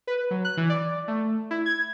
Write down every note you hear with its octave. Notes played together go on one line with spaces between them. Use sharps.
B4
F#3
F#6
E3
D5
A3
E4
G#6